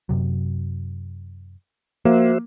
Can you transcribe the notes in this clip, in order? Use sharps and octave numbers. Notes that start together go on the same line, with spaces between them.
F#2 C3 F#3
F3 A#3 F#4 C5 E5